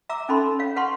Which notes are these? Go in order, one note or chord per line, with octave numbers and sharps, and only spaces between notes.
E5 A#5 D6 E6
C#4 D#4 A4 B5 C6
C#5 F5
B4 F5 F#5 A5 C6 C#6